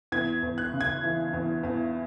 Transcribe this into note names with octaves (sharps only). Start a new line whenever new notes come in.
E2 G#6
E2
F#6
C#3
G#6
E3
E2
E2